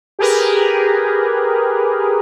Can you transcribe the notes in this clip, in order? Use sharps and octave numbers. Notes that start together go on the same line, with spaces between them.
G4 G#4 A#4 B4